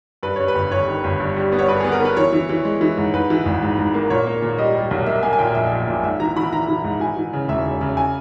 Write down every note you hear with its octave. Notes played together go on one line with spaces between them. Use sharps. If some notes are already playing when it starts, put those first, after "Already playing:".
G2 B4
G2 C#5
B4
G1
G1 C#5
D#3
G1
G2
G3
B3
C#5
G2 B4
B3 G#4
A#4
B3 B4
E3 C#5
E3
E3
G#3
E3
G#2
G#2 B4
E3
G#1
G#2
G#2
A#3
A#2 C#5
A#3
A#2
G3 D#5
G3
B1
A#3 E5
A#3 G#5
G#5
A#2 G5
A#1 E5
A#1
A#2
G#2 E5
E3 A#5
E3 B5
E3 A#5
E3
G#2
E3 G#5
E3
C#3
E1 E5
C#3
C#3
G#5